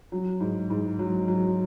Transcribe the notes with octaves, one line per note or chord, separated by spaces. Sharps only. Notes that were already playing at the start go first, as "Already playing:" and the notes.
F#3
G#2
G#2
F#3
F#3